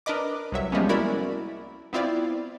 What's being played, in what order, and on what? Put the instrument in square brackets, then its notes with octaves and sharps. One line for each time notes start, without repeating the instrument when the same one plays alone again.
[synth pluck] D4 A#4 B4 D#5 D6
C2 F#3 E5
F3 G3 G#3 A#3 B3 C#4
E4 F#4 A#4 D5 B5
B3 C4 E4 F4 D5